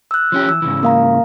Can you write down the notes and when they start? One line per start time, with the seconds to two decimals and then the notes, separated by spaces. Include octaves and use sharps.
0.11 E6 F#6
0.32 F3 C#4 G4
0.49 E3 E6
0.62 G#2 C#3 E3
0.83 A#3 F5 A#5